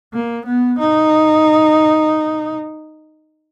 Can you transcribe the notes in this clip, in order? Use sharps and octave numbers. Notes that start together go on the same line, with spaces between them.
A#3
B3
D#4